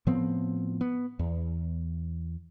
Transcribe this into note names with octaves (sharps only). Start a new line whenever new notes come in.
A2 F3 B3 C4
B3
E2